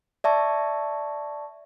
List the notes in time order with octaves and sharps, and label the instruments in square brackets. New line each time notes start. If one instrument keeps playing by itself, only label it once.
[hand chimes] D5 E5 A5 C#6